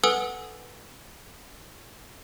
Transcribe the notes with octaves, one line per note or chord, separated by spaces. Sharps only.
A4 B4 F#5 G#5 D#6 E6